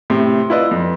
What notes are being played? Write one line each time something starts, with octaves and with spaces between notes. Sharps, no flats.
A2 C3
E4 F4 B4 D5 D#5
F2